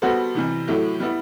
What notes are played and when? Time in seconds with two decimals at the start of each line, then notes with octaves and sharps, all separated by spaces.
0.02 G3 B3 F#4 A4 C5
0.35 C3 E3 G3
0.68 A2 F#3 A3 E4 G4
1.00 G3 B3 E4